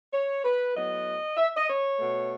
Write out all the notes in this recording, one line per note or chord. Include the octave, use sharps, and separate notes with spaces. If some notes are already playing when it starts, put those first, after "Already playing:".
C#5
B4
A2 F#3 B3 D#5
E5
D#5
C#5
B2 A3